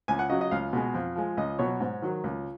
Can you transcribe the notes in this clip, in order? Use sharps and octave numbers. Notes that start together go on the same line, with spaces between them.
C#2 G#5
F#5
C#3 F#3 D#5
D#5
C#2 F5
B2 G#3
F2
F3 G#3
C#2 D#5
B2 F#3 C#5
G#2
D#3 F#3
C#2